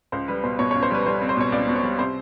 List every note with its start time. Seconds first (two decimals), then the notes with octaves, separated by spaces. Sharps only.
0.12 C#2 C5
0.28 G3 B4
0.44 B2 C5
0.59 B2 C#5
0.71 C#2 C#5
0.83 C5
0.91 G3 B4
1.06 G3 C5
1.21 C4
1.29 C5
1.37 B2 C#5
1.52 C#2 D5
1.68 B2
1.76 C#5
1.84 G3
1.99 C3 C5